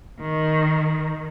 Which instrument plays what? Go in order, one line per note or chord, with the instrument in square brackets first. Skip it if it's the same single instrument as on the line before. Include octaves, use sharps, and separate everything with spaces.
[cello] D#3